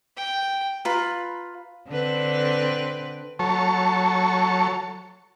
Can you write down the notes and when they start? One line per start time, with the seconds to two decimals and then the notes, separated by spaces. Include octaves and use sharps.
0.17 G5
0.85 F4 B4 A#5 B5
1.88 D3 C4 B4
3.39 F#3 A4 C#5 A5 C#6